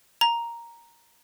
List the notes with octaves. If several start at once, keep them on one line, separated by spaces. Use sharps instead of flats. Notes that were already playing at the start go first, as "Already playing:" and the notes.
A#5